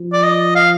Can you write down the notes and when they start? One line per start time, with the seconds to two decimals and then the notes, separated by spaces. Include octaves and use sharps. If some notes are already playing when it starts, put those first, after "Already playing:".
Already playing: F3
0.13 D5
0.23 D#5
0.56 F5